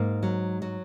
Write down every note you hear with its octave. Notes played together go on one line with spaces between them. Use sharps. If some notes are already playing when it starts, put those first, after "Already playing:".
Already playing: G#2 A#3
F#3
F#3